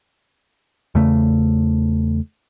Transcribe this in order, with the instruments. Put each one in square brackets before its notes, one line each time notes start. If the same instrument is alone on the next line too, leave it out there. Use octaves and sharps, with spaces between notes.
[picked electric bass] E2 C#3 A3